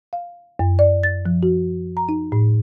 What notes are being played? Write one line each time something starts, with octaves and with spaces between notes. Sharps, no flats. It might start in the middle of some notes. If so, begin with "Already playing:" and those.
F5
F#2
D5
A6
F3
F#4
A#5
D#4
A2